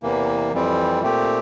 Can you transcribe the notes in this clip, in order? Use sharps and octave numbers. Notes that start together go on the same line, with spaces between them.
E2 C3 E3 A#3
F2 E3 G3 C4
A#2 A3 C4 G4